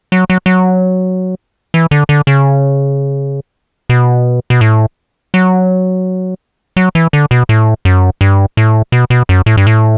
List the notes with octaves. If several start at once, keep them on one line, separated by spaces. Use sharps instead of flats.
F#3
F#3
F#3
E3
D3
D3
C#3
B2
B2
A2
F#3
F#3
E3
D3
B2
A2
F#2
G2
A2
B2
B2
F#2
A2
G2
A2